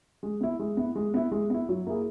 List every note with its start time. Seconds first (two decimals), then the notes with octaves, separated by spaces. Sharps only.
0.23 G#3
0.41 B3 E4
0.59 G#3
0.77 B3 E4
0.95 G#3
1.14 B3 E4
1.32 G#3
1.50 B3 E4
1.69 F#3
1.87 A#3 E4 G#4